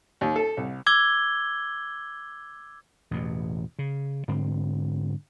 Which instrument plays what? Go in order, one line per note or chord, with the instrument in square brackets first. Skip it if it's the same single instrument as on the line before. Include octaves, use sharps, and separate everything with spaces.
[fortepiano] D#2
A4
C2
[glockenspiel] D6 E6 G#6 G7
[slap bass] A1 E2 B2
C#3
G#2 D3 C4